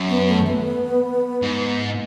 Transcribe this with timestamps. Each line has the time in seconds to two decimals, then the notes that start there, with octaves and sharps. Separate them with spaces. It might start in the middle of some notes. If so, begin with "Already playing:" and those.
Already playing: F#2
0.09 B3
0.28 A3
0.47 B3
1.42 G#2